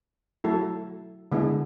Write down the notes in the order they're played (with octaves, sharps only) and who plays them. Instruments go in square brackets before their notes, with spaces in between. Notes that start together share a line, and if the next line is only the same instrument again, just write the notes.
[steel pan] F#3 A3 E4 A4
D3 G#3 B3 E4